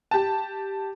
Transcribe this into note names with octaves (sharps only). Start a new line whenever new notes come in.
G4 A5